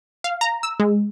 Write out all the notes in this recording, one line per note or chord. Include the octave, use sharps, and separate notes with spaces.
F5
A#5
E6
G#3